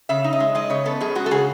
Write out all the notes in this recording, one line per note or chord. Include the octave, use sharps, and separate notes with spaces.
C#3 E5
D#4
D#5
G#3
G#3 D#5
C#3 C#5
B3 A4
F#2 G#4
G#3 F#4
A4
C#3 G#4